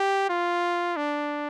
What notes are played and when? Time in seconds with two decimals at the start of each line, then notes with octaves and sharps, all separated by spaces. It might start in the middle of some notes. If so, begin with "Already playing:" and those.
Already playing: G4
0.29 F4
0.97 D4